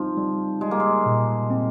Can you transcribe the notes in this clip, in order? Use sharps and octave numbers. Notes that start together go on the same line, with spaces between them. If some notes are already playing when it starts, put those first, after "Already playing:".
Already playing: F3 G3 C4 D#4
G3
G3 G#3
A#3
G#3
A#2
C4